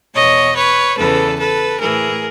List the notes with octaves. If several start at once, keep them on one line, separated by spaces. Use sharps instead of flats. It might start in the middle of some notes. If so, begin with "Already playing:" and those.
E2 B2 C#5 D#5
B4 C#5
E2 C#3 E3 A4 B4
A4 B4
A2 E3 G#4 A#4